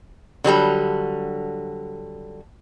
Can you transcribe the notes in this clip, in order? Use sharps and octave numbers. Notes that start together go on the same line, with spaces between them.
D3 F#3 G3 A4